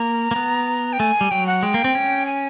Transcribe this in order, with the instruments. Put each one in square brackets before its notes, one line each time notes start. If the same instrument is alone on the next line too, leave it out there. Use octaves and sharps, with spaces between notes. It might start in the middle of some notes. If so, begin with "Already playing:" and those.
Already playing: [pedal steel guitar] A#3 [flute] A#5
[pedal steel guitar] A#3
B3
[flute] G5
[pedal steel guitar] A3 [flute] G#5
[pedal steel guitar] G3
[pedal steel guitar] F#3 [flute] G5
[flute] F#5
[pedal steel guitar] G#3 [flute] G5
[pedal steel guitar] A#3
C4
C#4
[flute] G#5